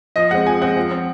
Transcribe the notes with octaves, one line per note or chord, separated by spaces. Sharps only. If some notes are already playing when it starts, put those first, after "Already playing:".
F3 D#5
G#3 C4 F#5
F3 G#5
G#3 C4 F#5
F3 F#5
C4